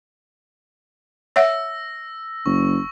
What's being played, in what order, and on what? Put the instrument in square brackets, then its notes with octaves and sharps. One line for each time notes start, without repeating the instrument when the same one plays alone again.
[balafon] C#5 E5 F#5 [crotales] E6 A#6
[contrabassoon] F#1 [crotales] C#6